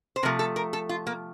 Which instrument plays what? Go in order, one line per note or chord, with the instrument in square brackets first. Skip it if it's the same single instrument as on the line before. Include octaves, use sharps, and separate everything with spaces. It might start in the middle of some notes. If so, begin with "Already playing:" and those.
[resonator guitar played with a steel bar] C5
C3 F3 A3 A#4
A4
A#4
A4
F4
A#3